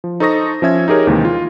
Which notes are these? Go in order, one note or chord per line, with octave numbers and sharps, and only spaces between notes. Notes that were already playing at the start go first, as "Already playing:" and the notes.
F3
D#4 A4 C5 C#6 D#6 A#6
F3 C#4 E5 G#6
D#4 G4 G#4 A#4 C#5
D#2 C3 D#3 E3 G#3 A#3
F4